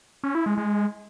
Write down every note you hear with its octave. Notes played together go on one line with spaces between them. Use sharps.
C#4
E4
G#3
G#3